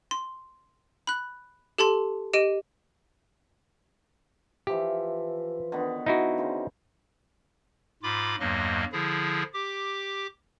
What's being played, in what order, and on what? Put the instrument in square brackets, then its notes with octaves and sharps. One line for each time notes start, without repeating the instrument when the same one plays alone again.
[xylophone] C6
B5 F#6
G4 A4 A5 C6
G4 D#5 D7 D#7
[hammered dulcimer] E3 F3 E5 [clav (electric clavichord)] G4
[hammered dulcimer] D3 D#3 B3
[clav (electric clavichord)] D#4 E4 F#4
[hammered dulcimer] C#3 C5
[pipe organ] G#2 F4 B5 D6
E2 G2 F#3 A#3 D#5
D3 F3 E4 G#4
G4 D6